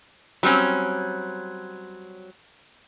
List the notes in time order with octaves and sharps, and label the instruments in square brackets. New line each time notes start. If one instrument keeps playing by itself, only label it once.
[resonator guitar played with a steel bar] F#3 G3 C4 C#4